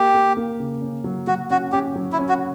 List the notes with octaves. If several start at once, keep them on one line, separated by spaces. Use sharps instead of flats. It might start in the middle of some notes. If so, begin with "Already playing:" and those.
Already playing: A#3 G4
A#3
A#3
C#3
C#4
F#3
F#3 F#4
C#4 F#4
C#4 G4
F#3
E4
C#4
F#4